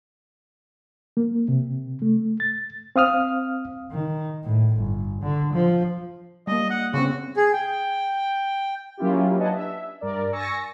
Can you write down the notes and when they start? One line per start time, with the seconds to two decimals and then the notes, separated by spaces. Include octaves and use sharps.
1.17 A#3
1.48 C3
2.02 A3
2.40 A6
2.96 C4 F5 D#6 F6
3.91 D#3
4.44 A2
4.76 G1
5.22 D3
5.53 F3
6.47 G3 A#3 D#5
6.70 F#5
6.93 C#3 B3 C4 F#4
7.37 G#4
7.53 G5
8.97 F#3 A#3 C#4 E4 F4 G4
9.38 D4 B4 D#5 F#5 G#5 A5
9.53 E5
10.01 G2 A#4 D5
10.32 G#5 C#6 E6 A6 A#6 C#7